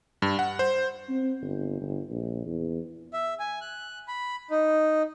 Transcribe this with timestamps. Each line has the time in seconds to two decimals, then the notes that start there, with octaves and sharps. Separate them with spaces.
0.22 G2
0.39 F#5
0.59 C5
1.09 C4
1.41 G1
1.81 G1
2.10 A#1
2.46 E2
3.13 E5
3.40 G#5
3.61 F#6
4.08 B5
4.50 D#4